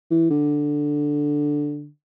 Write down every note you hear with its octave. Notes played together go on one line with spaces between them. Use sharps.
E3
D3